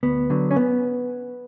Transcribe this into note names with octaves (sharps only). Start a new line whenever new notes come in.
D2 B3
D3 F#3
C#4
B3